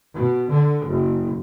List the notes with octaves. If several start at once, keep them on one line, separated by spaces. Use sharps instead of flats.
B2
D3
F#1